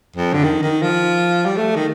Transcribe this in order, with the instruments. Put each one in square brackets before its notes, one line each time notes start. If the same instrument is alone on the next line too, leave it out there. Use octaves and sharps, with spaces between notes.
[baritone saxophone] F2
D3
D#3
D#3
F3
G3
A3
D#3